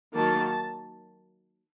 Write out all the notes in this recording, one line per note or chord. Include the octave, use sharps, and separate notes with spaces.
D#3 F#3 A#3 A5